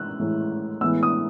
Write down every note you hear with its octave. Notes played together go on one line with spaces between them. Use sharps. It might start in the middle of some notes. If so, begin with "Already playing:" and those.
Already playing: A2 E3 G#3 E6 F#6
A2 E3 G#3
A2 E3 G#3 B3 E6
D#6